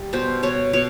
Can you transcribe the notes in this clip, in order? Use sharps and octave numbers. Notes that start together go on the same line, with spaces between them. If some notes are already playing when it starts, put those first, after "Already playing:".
Already playing: G3
B2 C5
B2 C#5
B2 C#5